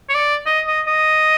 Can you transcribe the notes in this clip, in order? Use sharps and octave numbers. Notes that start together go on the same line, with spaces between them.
C#5
D5
D#5
D#5
D#5